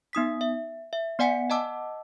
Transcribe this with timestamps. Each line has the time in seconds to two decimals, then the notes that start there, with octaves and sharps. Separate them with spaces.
0.13 B3 D#4 D#6 B6
0.41 E5
0.93 E5
1.19 B3 D5 F#5 G#5 B6 C#7
1.50 D#5 F#5 A5 D6 E6